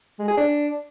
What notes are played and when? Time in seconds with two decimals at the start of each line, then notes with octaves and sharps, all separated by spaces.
0.19 G#3
0.28 G#4
0.37 D4